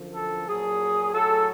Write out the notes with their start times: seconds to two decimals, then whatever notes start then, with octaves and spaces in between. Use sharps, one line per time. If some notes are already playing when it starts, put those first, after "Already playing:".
Already playing: F#2 D3 F3
0.13 A4
0.47 A#2 F#3 G#4
1.12 A2 F#3 A4